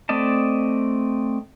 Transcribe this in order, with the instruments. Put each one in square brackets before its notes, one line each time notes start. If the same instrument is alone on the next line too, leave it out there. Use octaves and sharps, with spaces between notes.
[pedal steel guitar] A3 C4 D5 D#5 A5